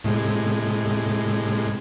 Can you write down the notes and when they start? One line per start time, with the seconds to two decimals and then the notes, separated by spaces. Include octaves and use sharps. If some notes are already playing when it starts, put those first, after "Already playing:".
0.04 A2 C3 G#3